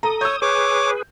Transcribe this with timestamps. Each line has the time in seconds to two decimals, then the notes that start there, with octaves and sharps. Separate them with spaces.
0.03 A4 A#5 D#6
0.21 C#5 E6 G6
0.42 G#4 B4 C#5 D6